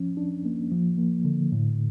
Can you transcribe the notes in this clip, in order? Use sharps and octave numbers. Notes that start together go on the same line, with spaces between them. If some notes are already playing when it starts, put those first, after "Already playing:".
Already playing: F3 C#4
D4
A#3
F3
A#3
D3
A2